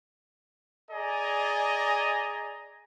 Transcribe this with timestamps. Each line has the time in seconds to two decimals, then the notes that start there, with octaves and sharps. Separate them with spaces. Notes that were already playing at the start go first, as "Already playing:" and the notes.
0.91 G#4 D5 D#5 G#5 A#5